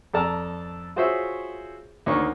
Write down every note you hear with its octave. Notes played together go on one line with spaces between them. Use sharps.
F2 A4 D5 A5 A#5
F4 F#4 G#4 C5 C#5 E5
D2 D#3 A#3 C#5 D5 C#6